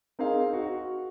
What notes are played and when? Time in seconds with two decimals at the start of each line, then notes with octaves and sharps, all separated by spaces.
0.19 C4 D#4 G#4 A#4 F5
0.53 F#4